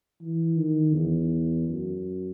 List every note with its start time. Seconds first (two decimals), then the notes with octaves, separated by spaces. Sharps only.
0.21 E3
0.57 D#3
0.94 E2
1.69 F#2